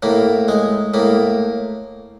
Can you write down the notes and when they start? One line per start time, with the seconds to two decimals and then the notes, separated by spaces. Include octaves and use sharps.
0.03 A2 A#3
0.48 G#3
0.94 A2 A#3